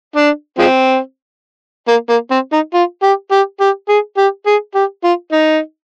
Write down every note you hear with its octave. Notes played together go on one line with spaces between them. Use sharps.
D4
F3 G#3 C4
A#3
A#3
C4
D#4
F4
G4
G4
G4
G#4
G4
G#4
G4
F4
D#4